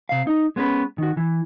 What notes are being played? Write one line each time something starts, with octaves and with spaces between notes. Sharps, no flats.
C3 F5
D#4
G#3 B3 C#4 A#4 B4
D#3 F#4
E3